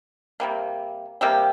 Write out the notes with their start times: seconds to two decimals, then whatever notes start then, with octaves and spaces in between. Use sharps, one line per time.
0.40 C3 G3 A#3
1.21 C3 G3 A#3 G4